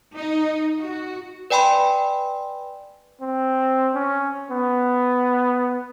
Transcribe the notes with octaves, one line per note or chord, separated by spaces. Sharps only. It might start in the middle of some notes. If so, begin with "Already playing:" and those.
D#4
F#4
B4 D5 G5 G#5 B5 C6
C4
C#4
B3